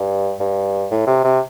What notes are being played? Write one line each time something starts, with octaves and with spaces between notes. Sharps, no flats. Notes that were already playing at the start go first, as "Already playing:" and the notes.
Already playing: G2
G2
A2
C3
C3